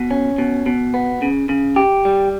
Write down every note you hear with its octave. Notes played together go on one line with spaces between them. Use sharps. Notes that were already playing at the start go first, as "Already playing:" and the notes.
Already playing: B2
C#4
B2
B2
B3
C#3
C#3
G4
G3